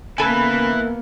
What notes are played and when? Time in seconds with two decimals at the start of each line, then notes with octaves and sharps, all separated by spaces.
0.18 C#3 A#3 B3 E4 A4 B4 G#5 B5